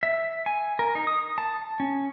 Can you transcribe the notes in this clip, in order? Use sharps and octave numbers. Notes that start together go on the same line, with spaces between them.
E5
G#5
A#4
D#4
D#6
A5
C#4